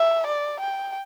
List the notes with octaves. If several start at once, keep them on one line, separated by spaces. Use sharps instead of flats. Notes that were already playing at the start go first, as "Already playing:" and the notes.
Already playing: E5
D5
G5